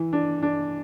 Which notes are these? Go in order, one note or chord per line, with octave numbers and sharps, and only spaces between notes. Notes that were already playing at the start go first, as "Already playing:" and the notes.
Already playing: E3
D4
D4